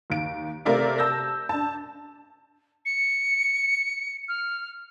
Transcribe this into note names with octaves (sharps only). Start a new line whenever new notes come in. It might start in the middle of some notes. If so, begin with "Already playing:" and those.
D#2 D7
C3 A3 A#4 D5 E5 F5
A5 E6 G6 A#6
D4 A5
C#7
F6